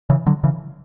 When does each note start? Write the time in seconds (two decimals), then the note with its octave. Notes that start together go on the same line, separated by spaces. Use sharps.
0.10 C#3 E3
0.26 D3 F#3
0.44 C#3 E3